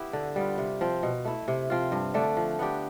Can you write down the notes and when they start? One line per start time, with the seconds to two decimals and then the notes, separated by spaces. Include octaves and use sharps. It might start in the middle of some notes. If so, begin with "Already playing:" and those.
Already playing: B3 E4 G4
0.13 D3
0.36 G3 B3 F4
0.58 C3
0.81 F3 C4
1.03 B2
1.25 A3 E4
1.48 C3
1.70 F3 C4 F4
1.92 G2
2.14 D3 A3 D4
2.37 F3
2.59 B3 D4 G4